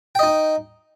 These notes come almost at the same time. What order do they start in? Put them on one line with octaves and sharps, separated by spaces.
G5 D#5 D#4